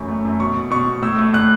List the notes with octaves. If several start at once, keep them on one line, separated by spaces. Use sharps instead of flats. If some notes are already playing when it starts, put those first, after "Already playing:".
Already playing: F#2 A2 E3 C#6
A3
F#2
B2 C#6
B2
B2 C#6
B2
A2 E6
A3
A2 F#6